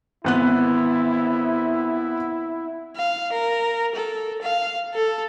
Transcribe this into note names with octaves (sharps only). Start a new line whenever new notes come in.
G#1 B3 E4 F#6
F5
A#4
A4
F5
A4